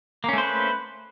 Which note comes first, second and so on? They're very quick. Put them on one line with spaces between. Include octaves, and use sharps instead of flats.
A#3 C#4 A3 C5 B4